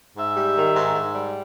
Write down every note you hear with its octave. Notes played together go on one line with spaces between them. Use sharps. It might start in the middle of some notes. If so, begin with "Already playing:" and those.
G#2 E5
G3
D#3
G#2
G#2
G3